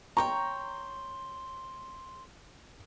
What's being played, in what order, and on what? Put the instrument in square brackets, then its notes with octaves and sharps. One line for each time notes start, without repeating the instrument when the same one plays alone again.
[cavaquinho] C#5 G5 C#6 [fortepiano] A#5 [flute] C6